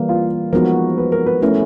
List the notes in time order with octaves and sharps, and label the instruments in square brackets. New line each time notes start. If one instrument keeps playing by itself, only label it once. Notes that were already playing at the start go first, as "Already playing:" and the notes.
Already playing: [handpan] E3 G3 A#3 [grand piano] B4
[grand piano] F4 F5
[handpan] F3 G#3 B3 D#4 F#4 [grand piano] A#4
[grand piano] B4
A#4
B4
[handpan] A3 C#4 E4 [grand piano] A#4